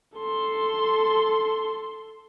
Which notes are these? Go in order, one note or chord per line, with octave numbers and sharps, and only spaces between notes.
A4 C6